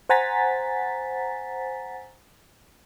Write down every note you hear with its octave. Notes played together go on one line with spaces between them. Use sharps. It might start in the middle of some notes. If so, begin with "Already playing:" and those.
C5 F#5 G#5 A#5 A6 B6